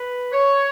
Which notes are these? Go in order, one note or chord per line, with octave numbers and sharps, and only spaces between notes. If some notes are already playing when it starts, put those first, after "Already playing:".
Already playing: B4
C#5